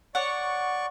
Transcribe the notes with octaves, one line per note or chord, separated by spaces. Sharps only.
C#5 D5 F#5 C#6